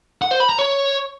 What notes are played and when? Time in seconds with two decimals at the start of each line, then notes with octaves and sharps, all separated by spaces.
0.22 F#5
0.31 C5
0.40 B5
0.49 A#5
0.59 C#5